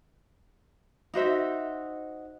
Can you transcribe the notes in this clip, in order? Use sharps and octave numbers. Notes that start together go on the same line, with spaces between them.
D#4 F#4 C5 E5